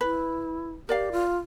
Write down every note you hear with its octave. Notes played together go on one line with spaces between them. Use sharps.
E4 B4
G4 A#4 D5 F5
F4